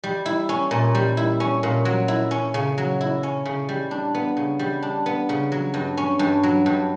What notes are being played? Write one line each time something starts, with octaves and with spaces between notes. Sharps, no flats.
G3
E4
C#4
A#2
G3
E4
C#4
A#2
F#3
E4
C#4
C#3
F#3
E4
C#4
C#3
G3
D4
B3
C#3
G3
D4
B3
C#3
F#3
G2
C#4
G2
F#3
G2